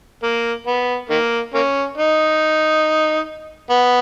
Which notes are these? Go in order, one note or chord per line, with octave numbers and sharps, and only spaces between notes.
A#3
B3
D#3 A#3
A#3 C#4
D#4
B3